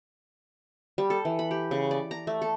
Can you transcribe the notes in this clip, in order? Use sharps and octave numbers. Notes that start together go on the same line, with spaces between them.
G3
A4
E3
B5
G4
C#3
D5
A#5
A3
A4